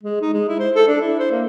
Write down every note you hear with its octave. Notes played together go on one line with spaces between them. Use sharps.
G#3
D#4
G#3
E4
C5
A4
D4
E4
C5
A#3